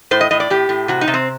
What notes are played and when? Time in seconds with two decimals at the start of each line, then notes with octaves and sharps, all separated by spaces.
0.11 A2 C5
0.21 D#5
0.31 A2 D#5
0.40 D5
0.50 A2 G4
0.69 A2
0.88 C3 F#4
1.01 D#4
1.08 C3
1.14 C4